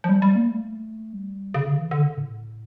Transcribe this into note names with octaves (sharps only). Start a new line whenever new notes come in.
F3
G3
G3
A#3
A3
G3
C#3
D3
E3
D3
C#3
A2